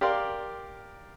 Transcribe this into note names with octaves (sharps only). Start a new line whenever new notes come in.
G4 A#4 D5 F5 C6